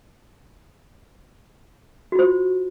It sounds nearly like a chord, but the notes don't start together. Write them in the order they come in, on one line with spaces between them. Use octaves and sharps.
F#4 F4 C5